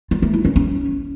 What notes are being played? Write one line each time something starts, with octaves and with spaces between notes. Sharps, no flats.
F4
A3
E4
C#4
C#4